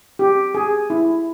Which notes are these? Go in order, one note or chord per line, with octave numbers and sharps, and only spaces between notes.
G4
G#4
E4